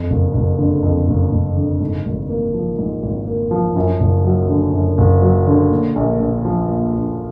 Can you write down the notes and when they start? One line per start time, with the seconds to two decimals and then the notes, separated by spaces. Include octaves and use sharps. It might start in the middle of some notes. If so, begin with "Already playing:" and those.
Already playing: F2
0.10 F#1
0.34 F#1
0.59 D3
0.83 F2
1.08 F#1
1.32 F#1
1.57 D3
1.80 G#2
2.05 G#1
2.29 A#3
2.54 F3
2.78 G#2
3.03 G#1
3.27 A#3
3.51 F3
3.76 F#2
4.00 F#1
4.25 F#3
4.49 D3
4.73 F#2
4.98 F#1
5.22 F#3
5.47 D3
5.70 A#2
5.96 A#1
6.20 A#1
6.45 F3
6.68 A#2
6.93 A#1